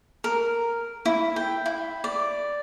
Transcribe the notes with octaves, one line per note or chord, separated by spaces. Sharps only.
A#4
E4
G5
E4
D5